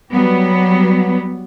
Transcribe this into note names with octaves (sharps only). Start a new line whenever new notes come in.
F#3 G3 B3